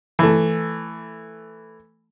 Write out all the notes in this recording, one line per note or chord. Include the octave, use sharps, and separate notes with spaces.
E3 A3